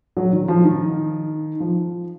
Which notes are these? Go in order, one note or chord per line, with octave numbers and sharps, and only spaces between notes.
F#3
D#3
F3
D#3
F3